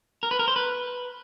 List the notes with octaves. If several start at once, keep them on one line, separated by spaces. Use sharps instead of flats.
A#4
B4
A#4
C5
B4